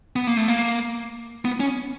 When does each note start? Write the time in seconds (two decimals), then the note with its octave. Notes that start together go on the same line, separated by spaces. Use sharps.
0.16 B3
0.27 A#3
0.37 A3
0.48 A#3
1.45 B3
1.60 C#4